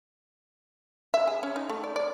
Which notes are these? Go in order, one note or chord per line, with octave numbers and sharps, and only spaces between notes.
E5
G#4
C#4
D#4
A3
D5
D5